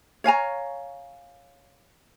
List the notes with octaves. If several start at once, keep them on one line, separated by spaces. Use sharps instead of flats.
C#5 F5 G#5 A#5